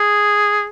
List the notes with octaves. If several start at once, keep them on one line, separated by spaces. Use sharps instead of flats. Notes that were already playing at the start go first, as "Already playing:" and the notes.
Already playing: G#4